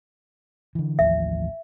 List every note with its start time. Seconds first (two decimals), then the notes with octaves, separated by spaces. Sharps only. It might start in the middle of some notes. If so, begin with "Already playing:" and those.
0.75 D3 E3
0.99 A1 D#2 F3 E5